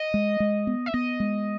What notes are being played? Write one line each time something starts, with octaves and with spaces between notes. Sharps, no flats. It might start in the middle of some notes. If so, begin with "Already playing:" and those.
Already playing: D#5
G#3
G#3
B3
E5
B3 D#5
G#3